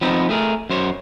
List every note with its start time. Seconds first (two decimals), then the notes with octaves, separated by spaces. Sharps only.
0.01 F3 B3 C4 D#4
0.29 A3 G#4 A#4
0.70 F#2 C5 C#5